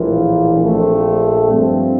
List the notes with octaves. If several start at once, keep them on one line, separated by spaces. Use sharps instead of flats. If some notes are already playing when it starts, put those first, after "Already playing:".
Already playing: A#1 A2 E3 A#3 F4
A#1 A#2 A3 C4
G2 F3 C4